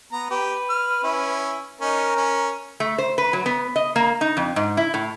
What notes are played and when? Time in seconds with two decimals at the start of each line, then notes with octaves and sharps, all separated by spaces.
0.12 B3 A#5
0.30 G4 B4
0.69 F6
1.04 C#4 E4
1.81 C#4 D#4 A#4
2.16 C#4
2.80 A3
2.98 C5
3.18 B4
3.33 F#3
3.46 B3
3.76 D#5
3.96 A#3
4.21 D#4
4.37 F2
4.56 G#2
4.77 E4
4.94 A2